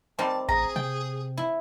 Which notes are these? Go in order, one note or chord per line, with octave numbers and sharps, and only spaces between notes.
D#3 G3 C4 A5
A1 G#4 A#5
C3 G5
E4